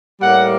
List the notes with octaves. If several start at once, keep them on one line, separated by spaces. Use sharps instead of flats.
A2 G3 A#3 F#5